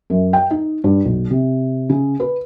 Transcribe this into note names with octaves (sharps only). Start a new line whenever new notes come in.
F#2
G5
D#4
G2
B1
C3
C#3
B4